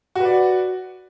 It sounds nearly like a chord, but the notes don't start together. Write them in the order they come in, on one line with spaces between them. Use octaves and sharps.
F#4 B4 D5